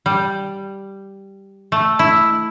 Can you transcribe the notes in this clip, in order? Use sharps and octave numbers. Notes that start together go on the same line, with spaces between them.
G3
A3
E4